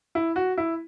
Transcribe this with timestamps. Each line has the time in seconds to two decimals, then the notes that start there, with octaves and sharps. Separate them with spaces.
0.15 E4
0.36 F#4
0.58 E4